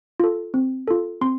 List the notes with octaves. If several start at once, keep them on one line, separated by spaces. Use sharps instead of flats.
F4 A4
C4
F4 A4
C4 C6